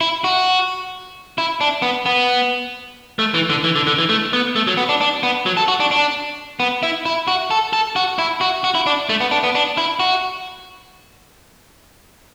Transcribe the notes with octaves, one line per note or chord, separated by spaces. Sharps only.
E4
F#4
E4
D4
B3
B3
A3
E3
D3
E3
D3
D3
E3
A3
B3
A3
F#3
B3
D4
D4
B3
F#3
A4
F#4
D4
D4
B3
E4
E4
F#4
A4
A4
F#4
E4
F#4
F#4
E4
D4
A3
B3
D4
B3
D4
E4
F#4